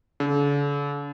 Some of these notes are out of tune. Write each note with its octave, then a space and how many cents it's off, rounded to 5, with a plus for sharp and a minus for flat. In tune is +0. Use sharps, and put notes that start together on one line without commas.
D3 -45